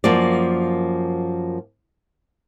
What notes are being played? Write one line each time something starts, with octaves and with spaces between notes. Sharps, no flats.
F#2 F3 A#3 D5